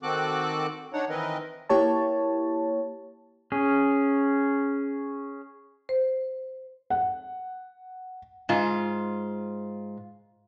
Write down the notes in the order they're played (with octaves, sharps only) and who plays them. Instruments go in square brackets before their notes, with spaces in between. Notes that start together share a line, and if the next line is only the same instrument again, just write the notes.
[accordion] D#3 C4 F#4 A4 D6 F#6
D4 D#4 C#5 F#5
D#3 E3 C4 A#4 B4 D#5
[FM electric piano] A#3 E4 G4 C#5 A5
[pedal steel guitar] C#4 G#4
[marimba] C5
[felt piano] F#5
[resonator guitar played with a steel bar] G#2 F4